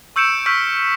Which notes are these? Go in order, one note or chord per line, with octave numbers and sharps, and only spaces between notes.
C#6 E6 G6 C#7 D7 E7
C#6 E6 F6 G6 B6